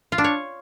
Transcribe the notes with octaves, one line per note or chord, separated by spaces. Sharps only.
F4
D4
C#5